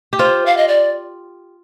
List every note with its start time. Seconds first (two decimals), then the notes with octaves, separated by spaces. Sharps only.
0.13 G4
0.19 F4 C5
0.46 F5
0.57 D#5
0.68 D5